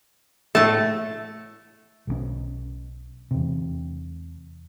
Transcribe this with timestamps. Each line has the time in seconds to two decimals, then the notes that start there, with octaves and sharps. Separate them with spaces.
0.55 A2 A3 A5
2.07 B1 F3 C#4
3.31 E2 C3